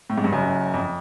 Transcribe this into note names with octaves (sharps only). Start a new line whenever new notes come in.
A2
G#2
G2
F#1 F#2
F2